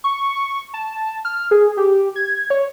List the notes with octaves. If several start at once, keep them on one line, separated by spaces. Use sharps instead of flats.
C#6
A5
F6
G#4
G4
G#6
C#5